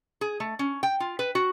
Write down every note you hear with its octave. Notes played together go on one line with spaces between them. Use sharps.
G#4
A3
C#4
G5
F4
B4
F#4